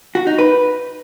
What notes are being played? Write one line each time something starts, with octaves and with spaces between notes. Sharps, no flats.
F#4
D#4
B4